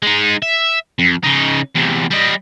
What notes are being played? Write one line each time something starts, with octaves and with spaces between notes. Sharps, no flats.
G#3 D#4
E5
F2
C#3 D#4
E2 C3
G3 D#5